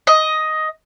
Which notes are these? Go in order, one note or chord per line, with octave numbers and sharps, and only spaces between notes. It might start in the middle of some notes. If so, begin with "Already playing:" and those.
D#5